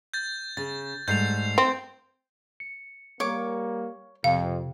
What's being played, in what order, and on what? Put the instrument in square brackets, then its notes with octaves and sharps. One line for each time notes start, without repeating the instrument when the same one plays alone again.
[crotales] G6 A6
[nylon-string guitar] C#3 [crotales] A6
[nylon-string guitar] G#2 G3 A3 [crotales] G6 C7 F7
[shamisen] C4 [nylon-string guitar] G5
[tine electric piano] C#7
[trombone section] G3 A#3 [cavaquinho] C#5 D6
[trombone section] F2 [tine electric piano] C3 [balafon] F5